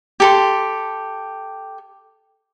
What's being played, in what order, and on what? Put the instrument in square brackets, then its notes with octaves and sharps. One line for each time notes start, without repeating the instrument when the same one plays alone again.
[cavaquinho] G4 A4 C6